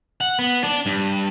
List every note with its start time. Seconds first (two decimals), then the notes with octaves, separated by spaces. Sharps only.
0.21 F#5
0.39 B3
0.64 D4
0.86 G2